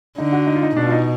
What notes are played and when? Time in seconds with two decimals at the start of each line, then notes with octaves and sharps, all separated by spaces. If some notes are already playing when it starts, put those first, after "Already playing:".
0.18 D3 D#4
0.33 F#4
0.47 D#4
0.55 F4
0.63 D#4
0.76 B2 D4
0.87 F4
0.91 D#4